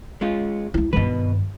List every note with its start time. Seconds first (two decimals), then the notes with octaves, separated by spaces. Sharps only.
0.21 G#3 C#4 F4
0.74 D2 E4
0.93 G2 B2 D#3 B4